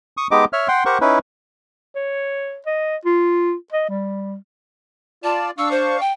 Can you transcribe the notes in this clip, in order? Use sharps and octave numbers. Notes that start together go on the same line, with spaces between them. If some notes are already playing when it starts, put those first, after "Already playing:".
C#6 D#6
G#3 B3 D#4 G4 D#5 D6
C#5 E5 F6
F#5 G5 C6
G4 A#4 C5 F#5 C#6
C#4 D#4 E4 B4
C#5
D#5
F4
D#5
G3
F4 D5 A5
D4 F5 C#6 E6
C5
G5